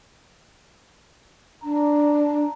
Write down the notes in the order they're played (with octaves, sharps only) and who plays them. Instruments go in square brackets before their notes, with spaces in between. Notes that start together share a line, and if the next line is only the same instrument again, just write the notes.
[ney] D4 [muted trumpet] A#5